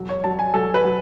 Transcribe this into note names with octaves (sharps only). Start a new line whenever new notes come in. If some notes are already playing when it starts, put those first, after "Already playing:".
Already playing: E1 F#3
C#5
F#3 A5
G#5
F#3 A4
B4
F#3